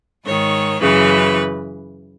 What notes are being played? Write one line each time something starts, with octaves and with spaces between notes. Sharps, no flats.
G#2 D#3 C#5
F#2 C#3 E3 B4